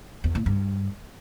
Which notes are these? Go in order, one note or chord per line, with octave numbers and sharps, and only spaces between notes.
E2
A2
G2